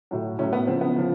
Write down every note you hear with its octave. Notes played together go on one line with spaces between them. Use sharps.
A2 F#3
A2 F#3 C#4
B3
C#3 F3 C4
B3
C#3 F3